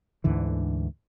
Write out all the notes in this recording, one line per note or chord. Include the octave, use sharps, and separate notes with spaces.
D2 G#2 D3 E3